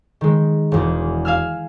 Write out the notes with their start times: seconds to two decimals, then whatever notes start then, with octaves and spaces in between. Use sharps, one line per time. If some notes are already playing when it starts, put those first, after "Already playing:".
0.21 D#3 G#3
0.72 E1 E2
1.25 F5 G#5 E6 F6